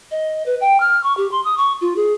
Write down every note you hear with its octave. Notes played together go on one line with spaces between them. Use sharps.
D#5
B4
G5
F6
C#6
G4
C6
D#6
C#6
F4
G#4